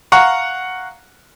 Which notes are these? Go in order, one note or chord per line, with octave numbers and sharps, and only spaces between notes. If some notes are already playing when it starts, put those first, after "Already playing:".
F5 F#5 A#5 C#6